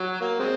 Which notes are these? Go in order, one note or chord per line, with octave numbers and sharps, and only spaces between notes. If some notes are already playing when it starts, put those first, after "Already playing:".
Already playing: F#3
A#3
G#3 C4